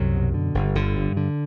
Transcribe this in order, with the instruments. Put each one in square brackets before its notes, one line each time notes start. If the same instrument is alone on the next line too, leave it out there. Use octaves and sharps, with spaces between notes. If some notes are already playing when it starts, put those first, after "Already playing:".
Already playing: [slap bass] C2 F#2 F#3
B2
D3
G1
G1 D3
G2
D3